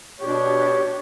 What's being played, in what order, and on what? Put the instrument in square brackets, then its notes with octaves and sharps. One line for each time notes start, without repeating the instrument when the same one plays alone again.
[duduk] B2 [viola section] D4 G4 [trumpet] C#5